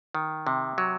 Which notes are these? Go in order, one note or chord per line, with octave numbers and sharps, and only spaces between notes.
D#3
C3
F#3